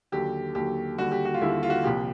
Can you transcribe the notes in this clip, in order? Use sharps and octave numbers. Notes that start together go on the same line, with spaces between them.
D#2 D3 F#3 G4
D#2 D3 F#3 G4
D#2 D3 G3 F#4
G4
F#4
F4
D#2 D3 G3 E4
F4
F#4
C2 A#2 F3 G4